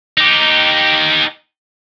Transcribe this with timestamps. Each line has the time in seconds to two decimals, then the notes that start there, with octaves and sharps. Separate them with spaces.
0.18 D#4 G4